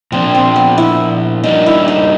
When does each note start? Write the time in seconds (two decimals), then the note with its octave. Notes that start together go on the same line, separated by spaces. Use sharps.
0.12 A#2 F3 A#3 C4 D4
0.35 C4
0.56 B3
0.78 E4
1.44 G3 A#3 D4 D#4 F#4 A#4
1.66 E4
1.88 D#4